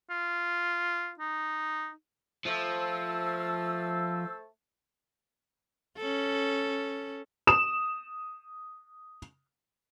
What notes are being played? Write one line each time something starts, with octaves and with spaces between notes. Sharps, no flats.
F4
D#4
F3 A3 C5 A5 E6
C#4 A4
D#6 E7